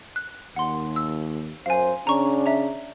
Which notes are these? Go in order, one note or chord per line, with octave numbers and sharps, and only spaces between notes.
F#6
D#2 F#5 C6
E6
F#2 C5 F5 G#5
C#3 C#4 D4 A#5 C#6
E5 A#5